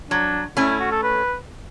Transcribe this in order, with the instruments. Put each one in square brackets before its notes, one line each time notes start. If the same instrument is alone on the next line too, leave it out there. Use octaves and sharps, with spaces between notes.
[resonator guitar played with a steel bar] F#3 [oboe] D4
[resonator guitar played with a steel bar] A3 C#4 [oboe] E4
[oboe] E4
F#4
A4
B4